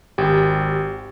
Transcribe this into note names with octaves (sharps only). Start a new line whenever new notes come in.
G#1 G4